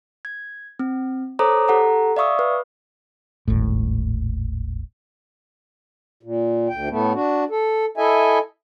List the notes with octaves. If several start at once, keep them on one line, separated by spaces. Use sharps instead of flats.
G#6
C4
A4 C5 C#5 A#5 D6 D#6
G4 A4 F#5 A#5
D5 E5 F5 C#6 D#6 E6
B4
D#1 G#1 A2
A#2
D2 G5
A2 A3 B3
D4 F#4
A4
E4 A4 D#5 E5 G#5